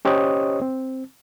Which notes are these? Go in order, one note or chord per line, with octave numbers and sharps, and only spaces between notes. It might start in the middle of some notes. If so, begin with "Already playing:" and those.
C#4 G4 C5 C#5 D#5 D#6
C4